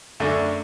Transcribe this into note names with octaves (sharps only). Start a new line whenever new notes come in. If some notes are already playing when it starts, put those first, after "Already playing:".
F#2 D3 A3 D4